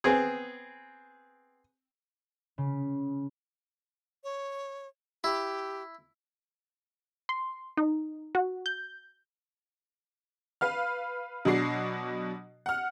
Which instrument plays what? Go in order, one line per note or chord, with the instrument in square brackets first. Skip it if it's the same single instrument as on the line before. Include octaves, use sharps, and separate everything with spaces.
[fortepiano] B3 C4 G#4
[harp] C#3
[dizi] C#5
[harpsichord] E4 [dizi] G4
[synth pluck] C6
D#4
F#4
G6
[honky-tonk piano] B4 F5 F6
B2 F#3 D4 F#4 C7
F#5 F6